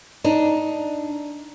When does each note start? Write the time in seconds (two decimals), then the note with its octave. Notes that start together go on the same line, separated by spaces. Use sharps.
0.24 D4 D#4